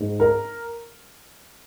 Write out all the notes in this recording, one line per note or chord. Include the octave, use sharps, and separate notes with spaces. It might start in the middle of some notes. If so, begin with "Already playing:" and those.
Already playing: G#2
A#4